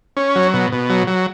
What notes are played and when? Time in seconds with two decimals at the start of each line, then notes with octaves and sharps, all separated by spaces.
0.17 C#4
0.35 F#3
0.54 B2
0.72 B2
0.90 F#3
1.07 F#3